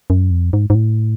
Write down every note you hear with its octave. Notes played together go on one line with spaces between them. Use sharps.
F#2
F2
G#2
G#2
A2